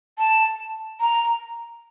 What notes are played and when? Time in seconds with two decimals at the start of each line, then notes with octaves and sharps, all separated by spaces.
0.19 A5
1.01 A#5